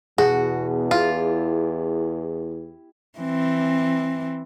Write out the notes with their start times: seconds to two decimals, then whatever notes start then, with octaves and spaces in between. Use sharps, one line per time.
0.18 E2 B2 F#4 G#4
0.91 E4 F4 G4
3.19 E3 C4